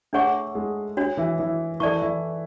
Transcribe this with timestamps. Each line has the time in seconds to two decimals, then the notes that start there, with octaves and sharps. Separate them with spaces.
0.13 A3 D4 G#4 A4 C#5 F#5 C#6
0.55 G#3 G#4
0.97 D4 F#4 C#5
1.17 E3 E4
1.39 E3 E4
1.80 E3 E4 A4 D5 A5 C#6
2.01 E3 E4